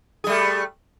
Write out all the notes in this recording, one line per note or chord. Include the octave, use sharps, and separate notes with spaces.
G3 A3 G#4